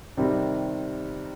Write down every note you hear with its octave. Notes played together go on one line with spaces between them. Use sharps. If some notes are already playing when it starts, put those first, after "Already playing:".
C3 D#3 G3 C4